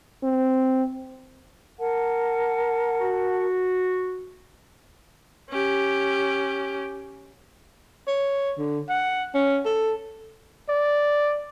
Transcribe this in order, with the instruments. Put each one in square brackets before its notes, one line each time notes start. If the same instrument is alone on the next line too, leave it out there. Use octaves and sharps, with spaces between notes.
[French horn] C4
[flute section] A#4 F#5 A5
[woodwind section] F#4
[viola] C#4 G4
[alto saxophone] C#5
D3
F#5
C#4
A4
[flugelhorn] D5